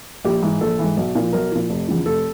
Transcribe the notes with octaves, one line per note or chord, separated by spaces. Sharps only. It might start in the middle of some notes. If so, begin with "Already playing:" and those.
A#1 G4
G#2 E3
A#1 A4
G#2 E3
B1
A#2 F3
B1 A#4
A#2 F3
F1
E2 C#3 F3
F1 A4